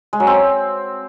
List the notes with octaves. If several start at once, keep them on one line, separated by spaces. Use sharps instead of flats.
G#3
F#3
C4